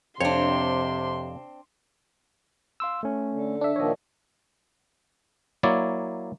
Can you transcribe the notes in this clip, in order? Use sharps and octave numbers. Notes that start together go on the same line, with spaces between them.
F2 C3 C4 D4 C#5 C6
F5 C6 E6
A3 C#4
D3
D4 E5
A#2 D#3 F3 C#5 D#5
F#3 A#3 E4 C#5 D5